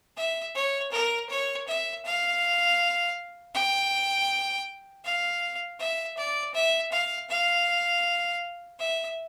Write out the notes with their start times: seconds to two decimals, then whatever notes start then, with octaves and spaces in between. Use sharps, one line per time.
0.17 E5
0.55 C#5
0.92 A#4
1.30 C#5
1.67 E5
2.05 F5
3.54 G5
5.05 F5
5.80 E5
6.17 D5
6.54 E5
6.92 F5
7.30 F5
8.79 E5